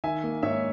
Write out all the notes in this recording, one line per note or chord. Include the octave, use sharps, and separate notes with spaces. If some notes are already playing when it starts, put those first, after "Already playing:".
D#3 E5 G#5
A#3
G#2 C#5 E5